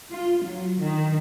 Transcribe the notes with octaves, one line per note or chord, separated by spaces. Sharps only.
F4
F#3
D#3